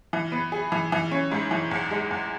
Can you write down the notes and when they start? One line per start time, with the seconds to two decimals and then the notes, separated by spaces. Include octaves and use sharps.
0.13 E3
0.32 B3
0.52 G#4
0.72 E3
0.92 E3
1.12 C#4
1.32 G#2
1.51 E3
1.71 E2
1.91 G#3
2.11 E2